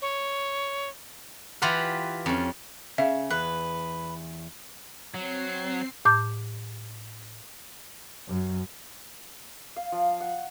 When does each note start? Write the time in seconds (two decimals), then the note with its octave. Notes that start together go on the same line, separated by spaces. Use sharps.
0.02 C#5
1.62 E3 F4 G4 B4 F#5
2.26 F2 C#4
2.98 C#3 E5 F5
3.30 E2 B4 F#6
5.14 F#3 C4 C7
6.05 A2 D6 G6
8.28 F#2
9.76 F5
9.92 F3
10.21 F#5